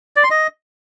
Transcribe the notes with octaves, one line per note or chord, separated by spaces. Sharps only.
D5
C6
D#5